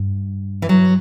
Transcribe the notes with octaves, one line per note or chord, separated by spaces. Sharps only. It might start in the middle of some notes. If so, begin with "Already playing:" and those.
Already playing: G2
E3
F#3